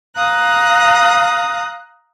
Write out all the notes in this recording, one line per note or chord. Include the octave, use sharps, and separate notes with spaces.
F5 A#5 D#6 F#6